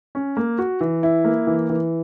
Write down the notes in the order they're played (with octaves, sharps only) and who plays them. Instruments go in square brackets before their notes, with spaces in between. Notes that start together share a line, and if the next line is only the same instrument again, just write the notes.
[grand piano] C#4
A#3
F#4
E3
E4
A#3
E3
E3